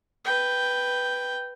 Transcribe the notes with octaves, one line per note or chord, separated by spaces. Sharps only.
B4 G5